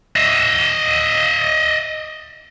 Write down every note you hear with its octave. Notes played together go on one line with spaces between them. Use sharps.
D#5 E5